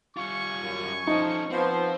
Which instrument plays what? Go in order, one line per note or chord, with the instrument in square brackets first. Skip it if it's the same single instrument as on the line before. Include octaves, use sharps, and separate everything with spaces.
[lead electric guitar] G3 F4 [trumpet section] G#5 C#6
[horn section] F#2
[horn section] F3 [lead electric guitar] C#4 A4 [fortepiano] D#4
[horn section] F3 B3 [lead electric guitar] C4